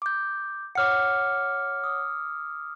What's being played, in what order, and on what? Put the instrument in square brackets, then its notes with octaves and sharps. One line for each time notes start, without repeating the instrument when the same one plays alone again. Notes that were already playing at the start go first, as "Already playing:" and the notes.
[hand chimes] D6 G6
[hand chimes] C#5 F#5 [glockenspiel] D6 F6 C#7
[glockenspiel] D#6